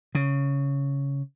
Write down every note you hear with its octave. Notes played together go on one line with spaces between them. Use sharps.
C#3